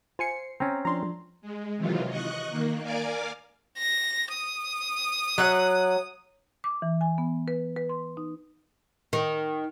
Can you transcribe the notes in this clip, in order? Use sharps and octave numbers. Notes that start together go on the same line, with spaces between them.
F4 C5 G#5 C7 C#7
C4 C#4 G5 A#5
F3 D4 A#5 C6
G#3
C3 D#3 E3 F#3 F4
D#5 C#6 F#6
D#3 A#3
A#4 D5 F5 G#5 D6
A#6
D#6
F#3 E5 F#5
D6
E3
G#5
B3
B4
B4
C6
D#4
D#3